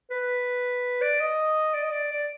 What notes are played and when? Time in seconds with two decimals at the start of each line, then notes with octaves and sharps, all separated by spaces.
0.11 B4
1.01 D5
1.20 D#5
1.74 D5
1.83 D#5
1.92 D5
2.11 D5